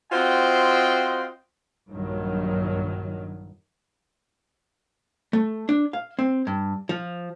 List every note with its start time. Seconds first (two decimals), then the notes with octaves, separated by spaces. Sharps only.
0.12 C4 F4 F#4 C5 D#5 G5
1.90 A#1 G2 D#3 F#3
5.33 A3
5.69 D4
5.93 F5
6.19 C4
6.47 G2
6.89 F3